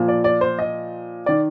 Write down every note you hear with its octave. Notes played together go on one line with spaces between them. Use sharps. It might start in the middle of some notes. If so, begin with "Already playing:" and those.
Already playing: A#2 F3
D5
D5
C5
D#5
D#3 D5